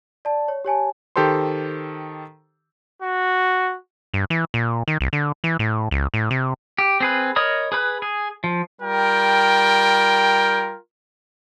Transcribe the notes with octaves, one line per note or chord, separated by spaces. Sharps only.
D5 A5
C#5
G4 C#5 G#5 A5
D#3 G4 A4 C5 C6
F#4
G2
E3
A#2
D#3
C2
D3
E3
A2
C#2
A2
C3
G4
C4 G#4 B4
A#4 C#5 D#5 B5 D#6
G#4 B4 B5 F#6
G#4
F3
G3 F4 A#4 G5